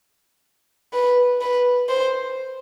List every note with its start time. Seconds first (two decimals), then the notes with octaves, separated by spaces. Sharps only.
0.93 B4
1.41 B4
1.89 C5